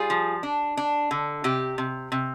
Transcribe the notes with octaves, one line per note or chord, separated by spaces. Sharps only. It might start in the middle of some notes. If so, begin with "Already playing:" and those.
Already playing: G3 F4 G#4
F3
D4
D4
D3
C3 G4
C3
C3